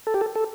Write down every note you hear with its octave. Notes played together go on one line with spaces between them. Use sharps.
A4
G4
A4
A4